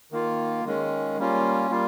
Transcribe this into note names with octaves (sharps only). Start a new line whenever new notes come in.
D#3 A#3 F4
D#3 G#3 C#4
G3 A#3 C#4 F4
G3 A#3 F4